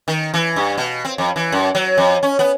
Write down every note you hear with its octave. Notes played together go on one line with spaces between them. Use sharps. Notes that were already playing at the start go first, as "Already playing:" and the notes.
D#3
E3
G2
B2
C4
F2
E3
F#2
F#3
F2
C#4
B3